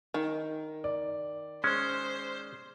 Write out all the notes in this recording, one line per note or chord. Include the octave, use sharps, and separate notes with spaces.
D#3
D5
G#3 C#4 C5